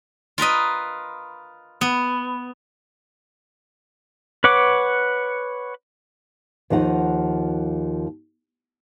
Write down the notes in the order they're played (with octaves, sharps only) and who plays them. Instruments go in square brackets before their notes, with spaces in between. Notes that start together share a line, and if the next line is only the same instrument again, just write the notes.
[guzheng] F4 A#4 B4 D#5
B3
[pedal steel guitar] B4 C#5 F#5 D6
[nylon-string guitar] D#2 F3 D#4 F#5